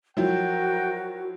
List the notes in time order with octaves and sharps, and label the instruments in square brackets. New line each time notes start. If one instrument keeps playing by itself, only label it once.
[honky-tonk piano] F3 F#3 E4 [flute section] F#4 A#4 [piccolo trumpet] G5